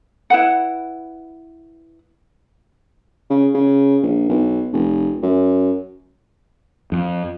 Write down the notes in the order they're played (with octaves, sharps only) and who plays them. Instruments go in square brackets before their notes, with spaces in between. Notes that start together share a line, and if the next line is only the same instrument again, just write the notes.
[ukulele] E4 B4 F#5
[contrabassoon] C#3
C#3
A#1
B1
F1
F#2
[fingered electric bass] F2